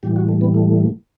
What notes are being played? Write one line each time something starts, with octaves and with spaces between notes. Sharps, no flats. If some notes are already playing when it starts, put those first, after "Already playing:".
A2 E3 G3 G4
F#4
A3
B3
A3